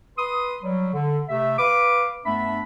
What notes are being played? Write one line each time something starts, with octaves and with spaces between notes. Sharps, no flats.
B4 C6 D#6
F#3 G3
D3
C3 A3 E5
B4 F5 D6
G2 A3 B3 D4 E5 B5